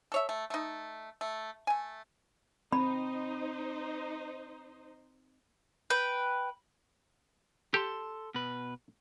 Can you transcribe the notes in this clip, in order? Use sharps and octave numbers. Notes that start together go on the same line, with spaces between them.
A4 C#5 E5
A3
A3 D#4
A3
A3 G#5
C4 D#4 C5 B5
B4 G5
G4 A4 A5 C6
B2 B4